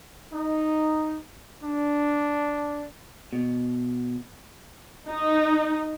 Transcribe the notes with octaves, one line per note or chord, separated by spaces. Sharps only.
D#4
D4
B2
D#4